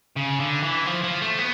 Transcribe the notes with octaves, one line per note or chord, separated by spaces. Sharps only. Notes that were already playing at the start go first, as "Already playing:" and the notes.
C#3
D3
E3
F3
F3
A3
B3